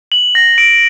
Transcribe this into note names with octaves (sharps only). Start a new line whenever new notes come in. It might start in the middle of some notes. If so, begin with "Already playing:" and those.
F#7
A#6
D7